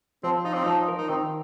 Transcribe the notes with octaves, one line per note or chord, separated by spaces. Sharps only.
F3 C4
D#4 F4
C4
F3 D#4
A#4
D#4
D#3 C4